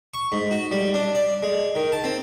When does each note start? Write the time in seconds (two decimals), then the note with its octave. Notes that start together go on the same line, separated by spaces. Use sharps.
0.14 C#6
0.32 G#2
0.51 F#4
0.71 G3
0.94 D4
1.15 D5
1.43 G#3
1.75 D#3
1.92 A5
2.04 C4